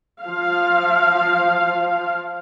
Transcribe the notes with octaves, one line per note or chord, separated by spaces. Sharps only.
F3 F5